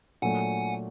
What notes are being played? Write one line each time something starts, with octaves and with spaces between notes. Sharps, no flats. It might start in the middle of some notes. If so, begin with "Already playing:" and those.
A#2 F#3 A3 D4 F#5 G#5